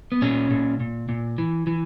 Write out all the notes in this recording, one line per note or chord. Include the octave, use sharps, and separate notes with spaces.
B3
A#2 C#4
A#2
A#2
A#2
E3
E3